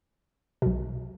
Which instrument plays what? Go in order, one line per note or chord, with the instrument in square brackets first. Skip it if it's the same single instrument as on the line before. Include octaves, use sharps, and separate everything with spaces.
[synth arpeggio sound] B1 B2